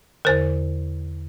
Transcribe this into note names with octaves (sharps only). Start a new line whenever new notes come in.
E2 D3 A#4 C5